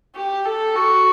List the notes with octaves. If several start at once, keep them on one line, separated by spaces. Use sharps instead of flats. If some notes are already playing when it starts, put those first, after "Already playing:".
G4
A4
F#4